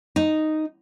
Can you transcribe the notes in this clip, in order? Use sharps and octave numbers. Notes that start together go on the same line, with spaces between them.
D#4